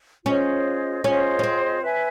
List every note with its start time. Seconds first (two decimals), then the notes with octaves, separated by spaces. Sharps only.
0.26 C#4 F4 G#4 C5 D#5
1.04 C#4 F4 G#4 C5 D#5
1.39 C#4
1.43 C4
1.82 B4 E5 G#5